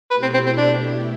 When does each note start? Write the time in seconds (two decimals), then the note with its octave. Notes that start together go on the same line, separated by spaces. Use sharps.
0.11 B2 A3 E4 G4 B4
0.22 C4
0.34 C4
0.46 C4
0.57 D4